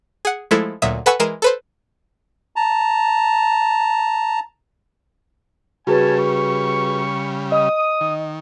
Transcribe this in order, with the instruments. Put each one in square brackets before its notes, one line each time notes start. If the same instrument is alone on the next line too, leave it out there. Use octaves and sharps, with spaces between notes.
[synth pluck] G#4 F#5
F3 G#3 A3 E4 A4
D2 A#2 F#3 E5 D#6
A4 B4 F#5 G#5 C#6 E6
E3 G#3 A#4 C7 D#7 E7
A4 B4 C5
[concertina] A5 A#5
[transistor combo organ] C#3 G3 [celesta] F#4 G#4 B4 [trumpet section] C#5 G#5 A5
[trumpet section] C#6
[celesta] D#5 [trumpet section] D#6
[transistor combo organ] D#3